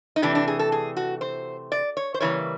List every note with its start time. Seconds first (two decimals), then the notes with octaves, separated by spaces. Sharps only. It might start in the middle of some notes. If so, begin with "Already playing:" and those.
0.16 D#4
0.22 C3 E3 A3 D4
0.35 D4
0.48 G#4
0.59 A4
0.72 G#4
0.97 F#4
1.21 C5
1.72 D5
1.97 C#5
2.14 C5
2.20 C#3 E3 G3 A#3 C#5